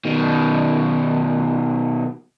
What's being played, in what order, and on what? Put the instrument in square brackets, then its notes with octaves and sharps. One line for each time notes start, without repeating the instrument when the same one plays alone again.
[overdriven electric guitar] B2 D#3